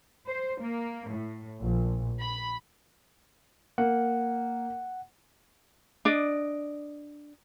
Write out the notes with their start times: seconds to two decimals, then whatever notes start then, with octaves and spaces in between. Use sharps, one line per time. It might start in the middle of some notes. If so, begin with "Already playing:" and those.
0.27 C5
0.61 A#3
1.08 A2
1.61 A#1
2.19 B5
3.78 A#3 F#5
6.05 D4 D5 D#5